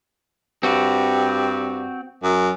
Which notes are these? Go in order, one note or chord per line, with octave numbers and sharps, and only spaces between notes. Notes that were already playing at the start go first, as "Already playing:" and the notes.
G2 C4 F#4
F#2